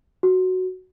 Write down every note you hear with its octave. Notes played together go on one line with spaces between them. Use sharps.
F#4